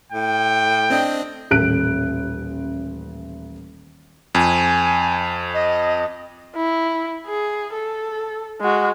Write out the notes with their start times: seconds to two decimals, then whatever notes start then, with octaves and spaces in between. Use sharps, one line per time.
0.12 A2 G5
0.90 C4 D4 D#5
1.51 D#1 A1 F#6 D7
4.35 F2 G#5
5.53 D#5
6.55 E4
7.27 G#4
7.73 A4
8.61 G#3 F#4